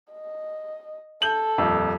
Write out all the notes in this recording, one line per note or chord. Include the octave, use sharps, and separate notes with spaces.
D#5
A4 G6 F#7
D#1 F2